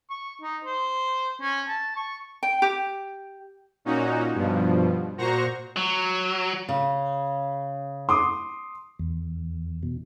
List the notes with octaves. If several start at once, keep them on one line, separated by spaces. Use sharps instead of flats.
C#6
D#4
C5
C#4
A5
C#6
G5
G4
A#2 C#4 D#4 F#4
G2 B2 F3
A#2 F#4 C5 A#5 C#6 A#6
F#3
C#3
C6 D6 D#6
E2
B2